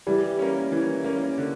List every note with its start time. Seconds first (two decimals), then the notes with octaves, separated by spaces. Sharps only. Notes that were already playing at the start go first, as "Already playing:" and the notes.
0.07 E3 G3
0.39 A#3 C#4
0.72 E3
1.04 A#3 C#4
1.38 D3